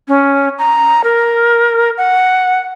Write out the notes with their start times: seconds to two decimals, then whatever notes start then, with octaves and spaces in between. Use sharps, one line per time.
0.08 C#4
0.59 A#5
1.04 A#4
1.97 F#5